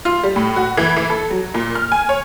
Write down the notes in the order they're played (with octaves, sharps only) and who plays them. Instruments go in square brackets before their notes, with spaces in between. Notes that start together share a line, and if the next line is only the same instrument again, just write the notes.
[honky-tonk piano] F4
G3
A2
F#4
E3
E3
A4
F#3
A#2
F6
G#5
C#5